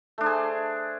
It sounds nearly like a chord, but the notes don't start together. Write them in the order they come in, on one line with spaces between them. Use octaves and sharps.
A3 D4 C5 G#4